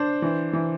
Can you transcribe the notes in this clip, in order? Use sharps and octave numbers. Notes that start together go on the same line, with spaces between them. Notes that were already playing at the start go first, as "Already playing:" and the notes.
Already playing: D4 C5
E3
E3